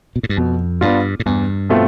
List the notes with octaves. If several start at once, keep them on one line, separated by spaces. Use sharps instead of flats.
B2
A2
G2
F2 B2
G2 B3 D4 F4
A2
E2 G2
B2 A3 C4 F4